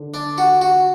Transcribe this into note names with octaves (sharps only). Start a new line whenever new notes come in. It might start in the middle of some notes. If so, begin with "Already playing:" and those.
Already playing: D3
D4
F#4
F#4